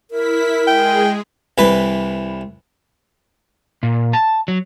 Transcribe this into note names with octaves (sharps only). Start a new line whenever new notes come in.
E4 A#4 B6
G#3 G#4 G5
C2 E3 B4
A#2
A5
F#3